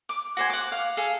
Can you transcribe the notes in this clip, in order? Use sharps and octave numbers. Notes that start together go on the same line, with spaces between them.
D6
F#4 C5 G#5
F#5 D6
F5
G#4 A4 F5